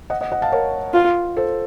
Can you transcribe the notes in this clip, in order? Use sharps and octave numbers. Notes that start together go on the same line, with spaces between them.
D#5 F#5
D#5 F#5
D#5 F#5
F5 A5
A#4 C#5
F4
A4 C5